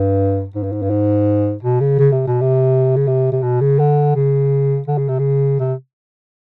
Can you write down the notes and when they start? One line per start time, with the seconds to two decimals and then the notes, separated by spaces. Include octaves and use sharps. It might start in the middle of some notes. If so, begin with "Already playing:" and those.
Already playing: G2
0.55 G#2
0.63 G2
0.72 G#2
0.82 G2
0.90 G#2
1.63 B2
1.80 C#3
1.99 C#3
2.12 C3
2.27 B2
2.41 C3
2.96 C#3
3.07 C3
3.32 C3
3.43 B2
3.61 C#3
3.79 D3
4.15 C#3
4.88 D3
4.98 C#3
5.08 C3
5.19 C#3
5.60 C3